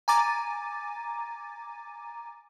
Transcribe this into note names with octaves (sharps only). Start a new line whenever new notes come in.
G#5 A#5 D6 A6 D#7